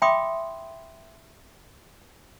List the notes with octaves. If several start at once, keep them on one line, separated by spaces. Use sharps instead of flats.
E5 G5 B5 C6 D6 D#6